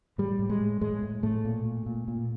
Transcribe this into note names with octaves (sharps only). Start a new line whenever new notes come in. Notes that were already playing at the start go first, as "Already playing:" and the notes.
A2 G3
A2
G#3
A2
A2 G#3
A2
A2 A3
A#2
A#2
A#2
A#2